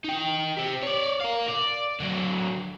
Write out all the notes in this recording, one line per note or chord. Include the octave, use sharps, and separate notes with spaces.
D#4 G5
C4 G4
C#5 D5
A#4 F5
D5
D3 F#3